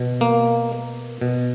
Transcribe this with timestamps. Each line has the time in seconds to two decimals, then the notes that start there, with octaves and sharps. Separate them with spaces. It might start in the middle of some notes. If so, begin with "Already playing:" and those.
Already playing: B2
0.21 A#3
1.21 B2